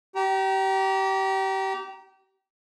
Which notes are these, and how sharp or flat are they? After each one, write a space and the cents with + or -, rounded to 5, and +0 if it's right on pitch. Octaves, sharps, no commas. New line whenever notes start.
G4 -30 A#5 +5